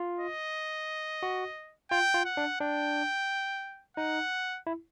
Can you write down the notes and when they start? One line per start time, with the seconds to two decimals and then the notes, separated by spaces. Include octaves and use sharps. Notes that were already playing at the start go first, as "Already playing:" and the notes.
Already playing: F4
0.20 D#5
1.23 F#4
1.91 F4 G5
2.14 F4
2.25 F#5
2.37 D4
2.60 D4 G5
3.97 D#4 F#5
4.67 E4